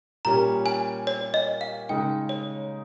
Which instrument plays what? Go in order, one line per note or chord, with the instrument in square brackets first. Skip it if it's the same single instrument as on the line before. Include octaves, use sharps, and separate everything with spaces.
[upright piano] A#2 G3 C#4 [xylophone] A#5
[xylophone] G#5
C#5
D#5
F5
[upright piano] C#3 G#3 D#4 [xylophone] G5
[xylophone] C#5